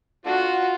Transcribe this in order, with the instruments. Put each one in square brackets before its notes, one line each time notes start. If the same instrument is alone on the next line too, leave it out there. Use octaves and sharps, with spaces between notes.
[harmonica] A3 D4 F4 [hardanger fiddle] F#4